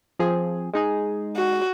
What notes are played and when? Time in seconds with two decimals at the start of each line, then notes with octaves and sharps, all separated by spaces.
0.19 F3 C4 G#4
0.73 G#3 D#4 G#4
1.36 F#4